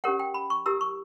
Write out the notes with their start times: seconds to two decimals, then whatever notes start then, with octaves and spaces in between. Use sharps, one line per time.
0.04 C#4 G4 A#4 C#5 F#5
0.19 G5
0.34 B5
0.50 C#6
0.66 E4 G4 A#4 E6
0.81 C#6